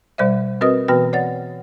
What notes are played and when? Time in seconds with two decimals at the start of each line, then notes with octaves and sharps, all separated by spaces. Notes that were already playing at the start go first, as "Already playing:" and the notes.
0.18 B2 G3 C5 D5 E5
0.61 C4 F#4 A#4 B4 D#5 D#6
0.88 B2 E3 B3 F#4 B4 G5
1.13 C#5 D5 F#5 A6